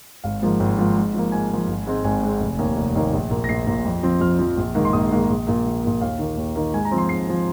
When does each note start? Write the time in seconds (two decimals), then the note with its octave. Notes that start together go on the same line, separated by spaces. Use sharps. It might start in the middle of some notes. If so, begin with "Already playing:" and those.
0.24 G#1 F5
0.42 G#2 F3 A#3
0.60 G#1
0.78 G#2 F3 A#3
0.96 G#2
1.14 F3 A#3
1.32 G#2 G#5
1.51 F3 A#3
1.68 G#1
1.86 G#2 G#3 C4
2.04 G#1 G#5
2.23 G#2 G#3 C4
2.41 F1
2.58 D#2 D#3 A#3
2.77 F1
2.95 D#2 D#3 A#3
3.13 A#1
3.31 A#2 A#3
3.44 A#6
3.49 A#1 C7
3.67 A#2 A#3
3.85 F2
4.03 F3 C4
4.21 F2 F6
4.39 F3 C4
4.57 A#1
4.75 G#2 D#3 A#3
4.85 C6
4.93 A#1 D#6
5.11 G#2 D#3 A#3
5.29 A#1
5.47 A#2 A#3
5.65 A#1
5.84 A#2 A#3
6.01 D#2 F5
6.19 D#3 A#3
6.37 D#2
6.55 D#3 A#3
6.74 G#2 G#5
6.85 A#5
6.91 F3 C4
6.98 C6
7.09 G#2 C7
7.27 F3 C4